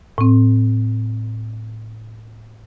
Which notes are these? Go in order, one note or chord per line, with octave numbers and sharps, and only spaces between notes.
A2 C4